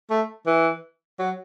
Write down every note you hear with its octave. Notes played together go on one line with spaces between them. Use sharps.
A3
E3
F#3